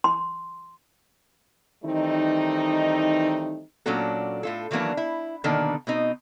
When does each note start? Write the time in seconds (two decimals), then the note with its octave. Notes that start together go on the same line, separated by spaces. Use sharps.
0.04 C6
1.84 D#3 E3 G3 A3 C4 D#4
3.86 A#2 F#3 C#4 D4 F#4 A4
4.43 A2 F4 A4
4.71 D#3 E3 F#3 A#3 B3 D4
4.97 E4
5.44 B2 D3 D#3 A#3 D4 A4
5.87 B2 C4 D#4